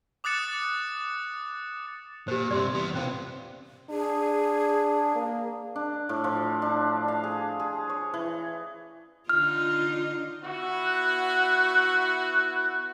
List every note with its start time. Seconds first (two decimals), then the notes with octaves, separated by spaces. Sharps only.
0.24 D6 D#6 F#6 A6 C#7 E7
2.28 A#2 G4 C5
2.51 G2 C3 D5 C6
2.74 E3 B3
2.95 C3 C#4 F4 C5
3.90 D4 G#4
5.15 A#3
5.76 D4
6.09 A2
6.24 F3
6.62 D4
7.08 F5
7.24 G#4
7.60 G#4
7.89 C#5
8.14 E3
9.29 D3 D#4 F4 F6
10.44 B3 E4 F#4
10.85 F#6